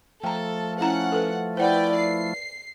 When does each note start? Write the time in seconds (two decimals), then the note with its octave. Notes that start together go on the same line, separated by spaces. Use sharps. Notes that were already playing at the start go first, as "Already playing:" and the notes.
0.24 F3 A3 A4 G5 A#5
0.81 C#4 E4 F#5 A#5
1.12 A4 B4
1.57 E4 B4 C5 D5 F#5 G5
1.95 C7